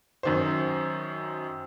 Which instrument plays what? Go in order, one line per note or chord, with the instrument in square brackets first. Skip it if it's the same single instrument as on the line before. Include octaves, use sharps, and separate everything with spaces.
[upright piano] F#2 D#3 C5